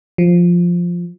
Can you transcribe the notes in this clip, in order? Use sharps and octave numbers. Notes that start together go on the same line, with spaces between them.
F3